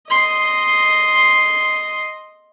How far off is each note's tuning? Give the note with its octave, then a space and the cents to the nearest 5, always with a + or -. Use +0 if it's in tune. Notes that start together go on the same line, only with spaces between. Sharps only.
D#5 +0 C6 +0